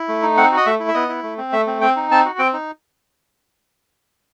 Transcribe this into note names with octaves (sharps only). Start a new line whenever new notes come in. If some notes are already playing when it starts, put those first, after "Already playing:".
Already playing: E4
A3
D#4
C4 F#5
F#4
D#5
A3 E5
E4
E5
B3 D#5
E4
A3
C4
A3 E5
C4
C4 G5
D#4
C4 A5
F#4
C4 G5
D#4